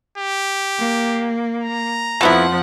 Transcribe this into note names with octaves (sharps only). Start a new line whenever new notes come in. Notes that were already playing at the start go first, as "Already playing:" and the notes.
G4
A#3
A#5
F2 F3 A3 B3 E4 F#5